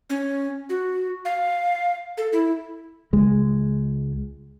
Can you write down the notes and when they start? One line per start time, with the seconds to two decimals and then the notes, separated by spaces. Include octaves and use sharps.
0.10 C#4
0.69 F#4
1.25 F5
2.18 A4
2.33 E4
3.13 C#2 G#3